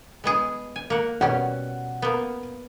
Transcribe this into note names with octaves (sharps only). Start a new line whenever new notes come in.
G#3 B3 G#4
G#5
A#3 F#5
B2 G3 C#4 F#5
A#3 B3